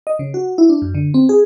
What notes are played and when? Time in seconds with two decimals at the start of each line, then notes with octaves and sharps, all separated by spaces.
0.07 D#5
0.19 C#3
0.34 F#4
0.58 E4
0.69 D4
0.82 F#2
0.95 D3
1.14 C4
1.29 G#4